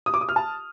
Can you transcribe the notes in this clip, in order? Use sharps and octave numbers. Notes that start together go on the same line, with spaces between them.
D#6
D6
D#6
F6
A5